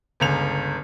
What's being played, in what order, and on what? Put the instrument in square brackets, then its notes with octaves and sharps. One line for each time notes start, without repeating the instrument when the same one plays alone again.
[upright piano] G1 C#2 F7